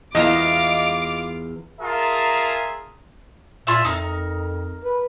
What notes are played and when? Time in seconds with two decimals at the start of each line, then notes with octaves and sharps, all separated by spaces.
0.15 E2 F4 D#5 F5 A#5 D6
1.80 F4 G#4 A#4 E5 A5 A#5
3.67 A#2 F4 G#4 E5
3.85 F2 D#4 A#4
4.84 B4